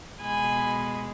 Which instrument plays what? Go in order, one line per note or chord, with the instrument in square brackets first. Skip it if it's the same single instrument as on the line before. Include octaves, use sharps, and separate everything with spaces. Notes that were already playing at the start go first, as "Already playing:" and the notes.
[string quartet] B2 G#3 G#5 B5